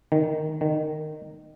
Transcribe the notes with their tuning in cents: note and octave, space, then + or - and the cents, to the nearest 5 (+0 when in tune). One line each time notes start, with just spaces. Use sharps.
D#3 -5
D#3 -20